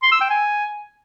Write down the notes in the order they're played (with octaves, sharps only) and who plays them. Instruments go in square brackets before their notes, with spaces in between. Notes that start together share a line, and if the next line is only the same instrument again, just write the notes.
[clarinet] C6
E6
G5
G#5